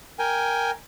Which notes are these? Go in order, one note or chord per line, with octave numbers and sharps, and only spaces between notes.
A#4 G5 G#5